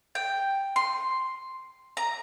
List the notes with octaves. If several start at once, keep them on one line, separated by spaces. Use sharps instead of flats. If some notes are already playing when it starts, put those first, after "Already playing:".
G5
C6
A#5